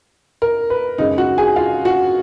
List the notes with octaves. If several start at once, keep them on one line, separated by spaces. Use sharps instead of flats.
A#4
B4
F#2 C#3 G#3 D#4 D#5
F#4 F#5
G#4 G#5
F4 F5
F#4 F#5